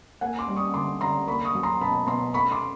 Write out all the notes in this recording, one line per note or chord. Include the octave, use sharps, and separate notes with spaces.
A#3 F#5 G#5
C6 D6
G3
C#6 D#6
D3 C6 D6
D3 A#5 C6
A#3 B5 C#6
C#6 D#6
F#3
A#5 C6
B2 A5 B5
B2 A#5 C6
A3 B5 C#6
C6 D6